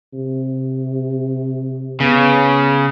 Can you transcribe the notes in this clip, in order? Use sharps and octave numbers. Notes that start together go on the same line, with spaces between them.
C3
C#3 B3